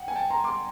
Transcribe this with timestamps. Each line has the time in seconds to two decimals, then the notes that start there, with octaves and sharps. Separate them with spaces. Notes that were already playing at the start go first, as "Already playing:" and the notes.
Already playing: F#5 G5
0.08 G#5
0.16 G5 A5
0.30 A#5 C6
0.44 C6 D6